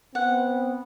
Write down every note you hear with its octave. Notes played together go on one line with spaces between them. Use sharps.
B3 C4 F#5